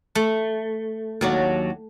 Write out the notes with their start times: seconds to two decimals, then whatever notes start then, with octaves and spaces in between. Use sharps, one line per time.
0.15 A3
1.21 D#2 F#3 D4